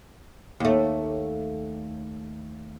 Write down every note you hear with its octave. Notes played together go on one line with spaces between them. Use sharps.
D#2 A3